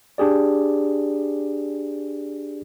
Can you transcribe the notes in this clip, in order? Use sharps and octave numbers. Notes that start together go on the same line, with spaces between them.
D4 G4 G#4 D5